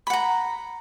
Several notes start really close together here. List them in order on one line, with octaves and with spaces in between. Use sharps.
B5 F#5 A#5